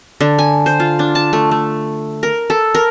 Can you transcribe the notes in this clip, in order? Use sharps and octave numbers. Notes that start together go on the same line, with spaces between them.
D3
G#5
C5
F4
D4
A5
A3
A3
A#4
A4
A#4